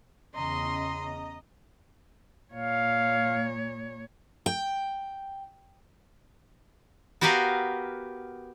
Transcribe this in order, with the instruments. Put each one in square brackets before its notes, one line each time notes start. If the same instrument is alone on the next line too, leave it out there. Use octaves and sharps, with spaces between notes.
[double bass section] E2 C#3 C#4 [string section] D#5 [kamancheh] A#5 [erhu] C6
[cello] A#2 C#5 [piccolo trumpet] F5
[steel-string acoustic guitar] G5
[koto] B3 F#4 G4 A#4 B4 F5